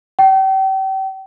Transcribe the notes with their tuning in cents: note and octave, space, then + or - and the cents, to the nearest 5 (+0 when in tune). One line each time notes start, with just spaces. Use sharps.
G5 -35